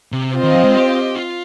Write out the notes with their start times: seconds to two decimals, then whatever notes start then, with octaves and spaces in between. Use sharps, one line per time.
0.12 C3
0.33 C4 F4 C5 D#5
0.43 D#3
0.54 F3
0.64 G#3
0.74 G4
1.15 F4